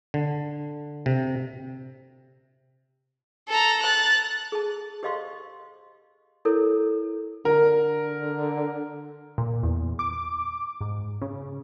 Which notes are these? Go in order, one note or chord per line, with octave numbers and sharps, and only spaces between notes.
D3
C3
A4 A#5
F#6 A6
G#4 A5
G4 C5 D#5 F5 C6 C#6
E4 A4 A#4 C#5
D3 A#4
A#2
E2
D6
G#2
C#3